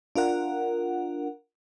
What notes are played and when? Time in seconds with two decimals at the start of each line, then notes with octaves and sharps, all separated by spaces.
0.16 D4 F4 A#4 F#5